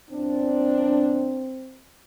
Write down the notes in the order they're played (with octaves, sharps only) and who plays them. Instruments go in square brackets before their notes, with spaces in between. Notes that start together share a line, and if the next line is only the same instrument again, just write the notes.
[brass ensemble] G1 A#2 D4 [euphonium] C4